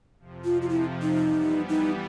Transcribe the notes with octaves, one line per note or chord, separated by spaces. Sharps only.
F2 C3 F3
F4
F4
E4
D#4
E3 G3 B3
D#4